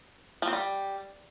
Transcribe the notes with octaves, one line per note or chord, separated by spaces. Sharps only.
F3
C4
G3